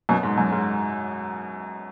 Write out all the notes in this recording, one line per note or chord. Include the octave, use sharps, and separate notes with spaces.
F#2 B2
G#2
F#2
G#2